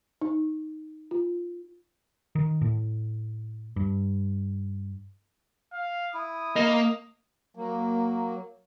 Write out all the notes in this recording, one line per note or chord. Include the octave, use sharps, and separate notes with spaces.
D#4
F4
D#3
A2
G2
F5
E4 D#6
A#3 D#5
F#3 A#3